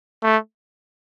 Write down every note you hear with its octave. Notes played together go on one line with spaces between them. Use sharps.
A3